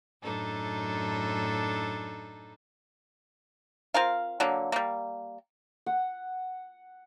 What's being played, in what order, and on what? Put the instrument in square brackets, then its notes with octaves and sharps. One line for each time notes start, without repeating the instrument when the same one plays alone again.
[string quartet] F#2 A2 D4 D#4 A4
[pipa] C4 F4 A#4 F5
D3 F#3 A#3
G3 A#3
[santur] F#5